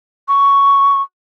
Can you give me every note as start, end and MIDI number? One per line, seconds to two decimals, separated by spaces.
0.28 1.01 85